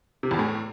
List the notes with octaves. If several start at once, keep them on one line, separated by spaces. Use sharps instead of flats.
C3
E2
A2